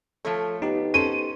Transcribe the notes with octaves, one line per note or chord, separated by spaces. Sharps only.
F3 A3 A4 C#5
B3 D#4 G4
C#4 A4 C5 D#7